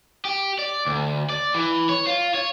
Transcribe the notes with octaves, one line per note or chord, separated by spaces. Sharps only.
G4
D5
D2
D5
E3
C#5
F4
C#5